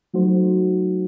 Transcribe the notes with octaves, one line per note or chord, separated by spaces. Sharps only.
F#3 A3 D#4 F#4 C5